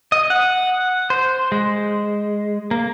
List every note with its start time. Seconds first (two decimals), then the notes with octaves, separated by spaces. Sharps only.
0.12 D#5
0.30 F#5
1.10 C5
1.52 G#3
2.71 A#3